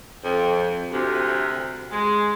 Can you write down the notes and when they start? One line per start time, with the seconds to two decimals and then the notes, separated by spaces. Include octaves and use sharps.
0.24 F2
0.92 D2 C3
1.92 G#3